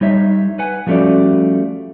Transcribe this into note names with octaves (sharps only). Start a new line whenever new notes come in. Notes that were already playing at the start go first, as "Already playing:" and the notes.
G3 D#4 C#5 E5
B4 F#5 G#5
F3 G3 A3 C#4 F#4 D5